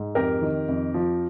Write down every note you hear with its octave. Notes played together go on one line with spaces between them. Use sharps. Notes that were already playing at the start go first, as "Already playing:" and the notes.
Already playing: G#2
F2 G4 A#4
D#3
F2
F3